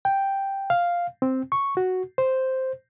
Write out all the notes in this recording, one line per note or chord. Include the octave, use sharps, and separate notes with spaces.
G5
F5
C4
C#6
F#4
C5